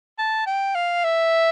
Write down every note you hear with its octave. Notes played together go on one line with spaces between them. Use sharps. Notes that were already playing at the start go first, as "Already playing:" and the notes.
A5
G5
F5
E5